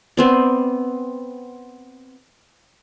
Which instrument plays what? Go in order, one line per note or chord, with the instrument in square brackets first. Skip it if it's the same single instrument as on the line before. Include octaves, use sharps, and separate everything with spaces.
[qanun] B3 C4 D5